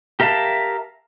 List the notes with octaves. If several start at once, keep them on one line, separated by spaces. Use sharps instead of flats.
G4 A#4 E5 F5 A5